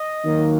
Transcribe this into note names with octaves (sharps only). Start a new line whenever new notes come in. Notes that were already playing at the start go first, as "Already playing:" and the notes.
Already playing: D#5
D#3 F#3 A#3